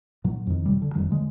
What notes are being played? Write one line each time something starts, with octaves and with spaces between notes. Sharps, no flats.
A#2 F#3
F2 D#3
F#1 C3 G3
D3
E1 F2 D#3 G3
D3 G#3